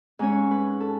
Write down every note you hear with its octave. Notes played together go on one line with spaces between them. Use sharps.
G#2 G#3 C#4 C#5
B4
A4